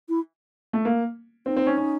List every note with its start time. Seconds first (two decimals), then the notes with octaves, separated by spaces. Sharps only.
0.09 E4
0.73 A3
0.85 A#3
1.46 C4 D#4
1.57 C4
1.66 C#4
1.77 C#4